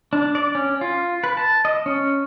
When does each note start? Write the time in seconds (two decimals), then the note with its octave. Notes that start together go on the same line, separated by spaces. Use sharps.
0.13 D4
0.35 D5
0.55 C#4
0.81 F4
1.24 B4
1.37 A5
1.65 D#5
1.86 C#4